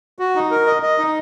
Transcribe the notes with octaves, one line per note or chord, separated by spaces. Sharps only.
F#4
D#4
A#4
D#5
D#5
D#4